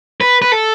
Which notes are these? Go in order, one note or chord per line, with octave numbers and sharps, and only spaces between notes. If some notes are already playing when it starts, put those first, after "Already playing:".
B4
B4
A4